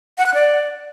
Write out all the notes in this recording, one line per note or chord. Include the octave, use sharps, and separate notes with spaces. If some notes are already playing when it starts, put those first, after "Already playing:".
F#5
F#6
D5